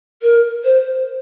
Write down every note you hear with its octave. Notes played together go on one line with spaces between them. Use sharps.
A#4
C5